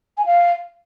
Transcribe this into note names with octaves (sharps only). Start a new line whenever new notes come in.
G#5
F5